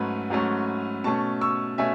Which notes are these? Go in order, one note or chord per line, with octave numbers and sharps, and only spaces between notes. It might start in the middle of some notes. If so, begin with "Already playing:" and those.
Already playing: G#2 F#3 A3 C#4 B4
G#2 F#3 A3 C#4
B2 A3 C#4 A5 C#6
C#6 E6
B2 A3 C#4 E5 G#5